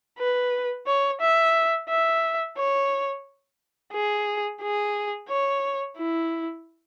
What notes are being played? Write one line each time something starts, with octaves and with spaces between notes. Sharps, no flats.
B4
C#5
E5
E5
C#5
G#4
G#4
C#5
E4